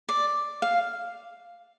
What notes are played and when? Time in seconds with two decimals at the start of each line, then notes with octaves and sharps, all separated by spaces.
0.09 D5
0.62 F5